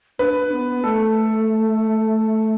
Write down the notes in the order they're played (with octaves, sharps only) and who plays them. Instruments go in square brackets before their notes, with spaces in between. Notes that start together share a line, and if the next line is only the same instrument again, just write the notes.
[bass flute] D4 [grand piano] B4
[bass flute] B3
[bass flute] A3 [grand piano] A4